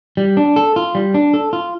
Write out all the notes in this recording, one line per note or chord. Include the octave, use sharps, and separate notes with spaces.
G3
D4
A4
F4
G3
D4
A4
F4